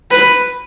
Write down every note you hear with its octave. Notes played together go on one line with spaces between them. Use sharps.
B4